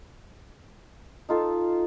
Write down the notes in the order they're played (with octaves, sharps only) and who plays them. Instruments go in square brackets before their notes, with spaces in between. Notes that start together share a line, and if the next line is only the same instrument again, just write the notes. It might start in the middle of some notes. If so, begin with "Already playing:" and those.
[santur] D#4 F4 A4